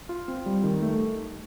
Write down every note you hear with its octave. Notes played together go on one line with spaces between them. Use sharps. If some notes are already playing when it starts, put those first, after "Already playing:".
F4
C4
G3
D#3
A3